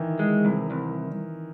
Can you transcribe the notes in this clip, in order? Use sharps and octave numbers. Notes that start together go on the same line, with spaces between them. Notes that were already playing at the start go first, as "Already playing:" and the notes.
Already playing: D#3 E3
G#3
C2
C2